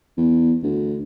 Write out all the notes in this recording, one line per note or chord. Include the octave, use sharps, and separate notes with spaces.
E2
D2